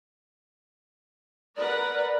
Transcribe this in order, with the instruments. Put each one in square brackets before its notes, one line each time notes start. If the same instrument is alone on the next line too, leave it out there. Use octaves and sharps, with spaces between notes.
[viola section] A#4 B4 F#5 [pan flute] D5